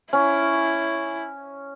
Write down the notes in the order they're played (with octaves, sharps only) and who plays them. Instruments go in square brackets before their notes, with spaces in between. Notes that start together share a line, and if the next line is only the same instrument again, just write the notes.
[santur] C#4 [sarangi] E4